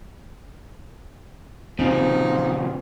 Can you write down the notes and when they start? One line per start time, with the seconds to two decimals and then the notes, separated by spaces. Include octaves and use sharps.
1.79 A#2 C#3 F3 C4 D#4